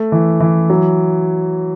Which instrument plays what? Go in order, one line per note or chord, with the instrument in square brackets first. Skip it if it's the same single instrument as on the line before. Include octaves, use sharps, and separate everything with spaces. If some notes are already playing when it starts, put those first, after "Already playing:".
Already playing: [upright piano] A3
E3
E3
F#3